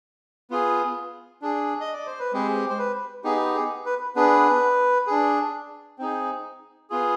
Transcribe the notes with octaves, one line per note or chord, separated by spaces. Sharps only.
B3 F4 G#4
D4 G#4
D#5
D5
C5
B4
G#3 C4 G4 G#4
C5
B4
B3 D#4 G4 G#4
G#4
B4
B3 D4 G#4 B4
D4 G#4
C4 D#4 G#4
B3 F4 G#4